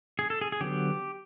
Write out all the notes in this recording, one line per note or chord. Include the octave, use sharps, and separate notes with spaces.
G#4
A4
G#4
G#4
D3 F#3 B3 G4